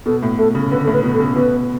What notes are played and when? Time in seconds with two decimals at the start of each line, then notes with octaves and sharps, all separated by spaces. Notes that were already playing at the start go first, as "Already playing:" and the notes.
0.06 B2 A4
0.23 A2
0.38 A2 A4
0.55 C#3
0.71 D3 B4
0.84 A2 A4
0.93 B4
1.03 B2
1.14 A4
1.20 C#3
1.36 B2 B4